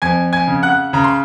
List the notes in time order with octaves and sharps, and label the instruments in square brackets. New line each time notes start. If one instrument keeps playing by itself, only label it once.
[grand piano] F2 G#5 G#6
G#5 G#6
C#3
F#5 F#6
C#3 A#5
C6